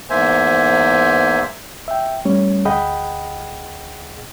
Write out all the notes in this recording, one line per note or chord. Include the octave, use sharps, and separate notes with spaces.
E2 G#2 A#3 C5 E5 G#5
E5 G5
G3 A3 C#4 C#5
D2 G#4 D#5 F#5 G5 B5